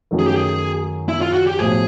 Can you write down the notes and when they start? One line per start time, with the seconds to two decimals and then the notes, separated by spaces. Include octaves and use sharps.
0.11 F#2 D#3 F#3 A3
0.19 G#4
0.27 G4
0.36 G#4
1.08 E4
1.21 F4
1.33 F#4
1.47 G4
1.59 B1 A2 F3 G#4